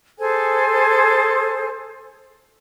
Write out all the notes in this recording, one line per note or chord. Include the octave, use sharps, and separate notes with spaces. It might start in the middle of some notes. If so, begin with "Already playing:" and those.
G#4 A4 C5 G#5